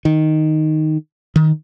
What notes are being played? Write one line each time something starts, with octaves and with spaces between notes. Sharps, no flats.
D#3
D#3